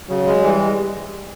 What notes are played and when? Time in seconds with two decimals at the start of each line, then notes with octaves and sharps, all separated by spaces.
0.09 C#3 F#3
0.27 G#3
0.43 E3 G3
0.60 G#3